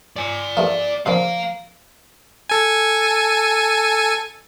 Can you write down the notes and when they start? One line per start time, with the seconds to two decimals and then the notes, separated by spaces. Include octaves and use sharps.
0.16 D5 G#5
0.57 G2 A3 A#3
1.06 A#2 C#3 F3 F5 A#5
2.49 A4 G#5